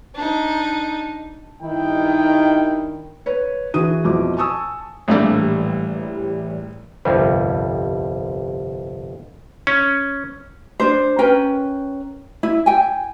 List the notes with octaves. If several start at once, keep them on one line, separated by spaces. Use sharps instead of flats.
D4 D#4
G2 D#3 E4 G5
B4 C#5
E3 F#4 G#4 D#6 D#7
F2 B2 E4 D6
G#5 A5 C#6 D#6 E6
A#1 A2 E3 G3 A3 D5
G1 C2 F2 G3
C#4
D4 C5
C#4 A#4 B4 G5
E4
G5 G#5